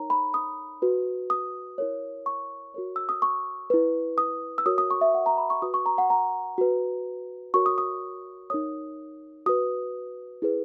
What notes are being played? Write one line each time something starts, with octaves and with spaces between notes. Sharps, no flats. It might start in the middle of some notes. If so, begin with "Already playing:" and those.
Already playing: D#4 A#4 C#5 A#5
B5
D#6
F#4 B4
D#6
E4 A#4 C#5
C#6
F#4 A#4 C#5
E6
D#6
C#6
E4 B4
D#6
E6
F#4 A#4 C#5 D#6
D#6
C#6
E5
F#5
A#5
B5
C#6
F#4 B4 D#6
C#6
A#5
F#5
A#5
F#4 B4
F#4 A#4 C#5 C#6
D#6
D#6
D#4 A#4 C#5 D#6
F#4 B4 D#6
E4 G#4 B4